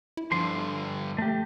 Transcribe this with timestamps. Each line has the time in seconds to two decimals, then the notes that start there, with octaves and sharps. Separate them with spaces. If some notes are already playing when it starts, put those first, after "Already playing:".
0.17 E4
0.32 G2 D3 F3 C6
1.19 A3 G4